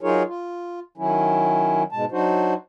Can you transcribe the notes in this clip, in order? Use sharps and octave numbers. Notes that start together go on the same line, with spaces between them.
F#3 D#4 F4 G#4 A#4 C#5
F4
D#3 F#3 C#4 E4
G#2 B2 G#3 A5
F#3 D4 D#4 F#4 C5